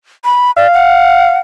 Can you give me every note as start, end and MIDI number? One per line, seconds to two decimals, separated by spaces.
0.24 0.51 83
0.57 0.67 74
0.57 1.41 77
0.74 1.38 78